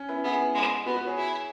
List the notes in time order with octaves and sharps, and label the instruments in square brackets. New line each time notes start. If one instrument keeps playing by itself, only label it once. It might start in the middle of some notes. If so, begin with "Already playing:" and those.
Already playing: [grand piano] C#4
B3 E4
[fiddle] B3 [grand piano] E4 G#4
[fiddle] G#3
[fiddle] B3 [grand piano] F#4 B4
[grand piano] F#4 B4
G#4 C#5
[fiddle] E4